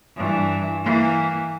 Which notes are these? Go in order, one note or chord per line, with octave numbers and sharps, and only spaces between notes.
G2 E3
E3 A#3